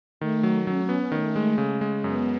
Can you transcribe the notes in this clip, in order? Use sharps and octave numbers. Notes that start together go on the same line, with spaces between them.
D#3 A3
F#3
F#3 C#4
B3
D#3 A3
G#3
C#3
G#3
F#2 B3